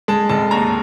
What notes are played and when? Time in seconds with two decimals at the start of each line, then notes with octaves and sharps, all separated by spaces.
0.08 G#3 A5
0.29 F1 A5
0.51 D#2 A#5